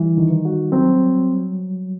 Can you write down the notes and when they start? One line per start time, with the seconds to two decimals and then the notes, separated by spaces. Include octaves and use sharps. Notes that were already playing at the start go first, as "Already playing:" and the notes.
Already playing: E3 G3
0.17 D#3
0.45 F#4
0.72 F#3 C4